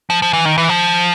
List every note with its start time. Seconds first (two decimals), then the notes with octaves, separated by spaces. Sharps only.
0.10 F3
0.22 F3
0.33 E3
0.45 D#3
0.58 E3
0.69 F3